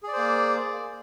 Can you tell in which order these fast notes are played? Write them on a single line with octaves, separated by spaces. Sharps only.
G#4 D5 C5 A#3